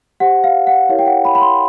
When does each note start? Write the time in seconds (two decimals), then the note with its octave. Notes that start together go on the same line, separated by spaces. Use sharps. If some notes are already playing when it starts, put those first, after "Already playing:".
0.20 G4 C5 F#5
0.44 F5
0.67 F#5
0.89 E4 G4 A#4 C#5 F5
0.99 G5
1.07 F#5
1.25 B5
1.35 B5
1.41 C6